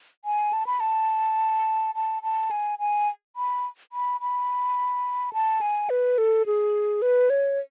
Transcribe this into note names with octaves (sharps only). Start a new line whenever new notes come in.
G#5
A5
B5
A5
A5
A5
G#5
G#5
B5
B5
B5
A5
G#5
B4
A4
G#4
B4
C#5